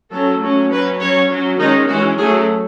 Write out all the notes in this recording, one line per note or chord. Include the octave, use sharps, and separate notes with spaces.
F#3 C#4 A4
F#3 A3 C#4
F#3 C#4 B4
F#3 C#4 C#5
F#3 C#4
D#3 G#3 C#4 D#4
E3 G#3 C#4 F#4
F#3 A3 C#4 G#4